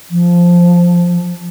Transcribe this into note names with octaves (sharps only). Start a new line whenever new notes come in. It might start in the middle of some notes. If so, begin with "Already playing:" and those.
F3